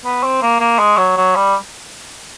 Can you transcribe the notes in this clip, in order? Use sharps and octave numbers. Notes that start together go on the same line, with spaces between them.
B3
C4
A#3
A#3
G#3
F#3
F#3
G3